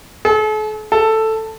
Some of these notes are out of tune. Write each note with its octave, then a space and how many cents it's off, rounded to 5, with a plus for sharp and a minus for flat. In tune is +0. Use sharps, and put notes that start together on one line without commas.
A4 -45
A4 +5